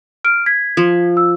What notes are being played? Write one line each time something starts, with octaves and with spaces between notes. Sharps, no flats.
F6 D7
G#6 B6
F3
E6